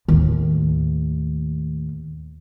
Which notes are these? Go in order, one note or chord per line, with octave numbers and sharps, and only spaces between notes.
D#2 A2